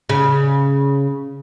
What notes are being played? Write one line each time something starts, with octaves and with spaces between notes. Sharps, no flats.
C#3